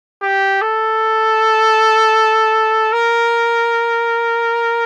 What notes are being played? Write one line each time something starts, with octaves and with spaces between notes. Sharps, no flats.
G4
A4
A#4